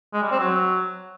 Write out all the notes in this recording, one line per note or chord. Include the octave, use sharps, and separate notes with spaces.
G#3
G3
C4
F#3